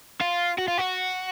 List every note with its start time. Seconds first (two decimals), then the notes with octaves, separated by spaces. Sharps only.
0.21 F4
0.59 F#4
0.68 F4
0.78 F#4